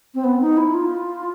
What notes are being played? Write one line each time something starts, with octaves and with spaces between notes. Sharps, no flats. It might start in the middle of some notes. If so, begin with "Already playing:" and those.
C4
B3
D#4
E4
F4